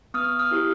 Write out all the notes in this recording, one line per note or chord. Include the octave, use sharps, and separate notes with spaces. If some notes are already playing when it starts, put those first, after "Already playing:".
B3 D#6 F6
D#6 F6
E4 G4